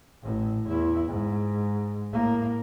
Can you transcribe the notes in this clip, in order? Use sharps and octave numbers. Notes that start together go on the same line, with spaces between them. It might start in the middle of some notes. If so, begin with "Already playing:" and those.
A1 A2
E2 E4
G#2
A2 A#3